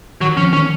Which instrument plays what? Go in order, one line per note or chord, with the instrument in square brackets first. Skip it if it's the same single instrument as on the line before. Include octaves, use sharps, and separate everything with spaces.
[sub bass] D#3 [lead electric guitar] F#3
[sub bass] F3 [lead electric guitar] C#4
[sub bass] D#3 [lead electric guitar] C#4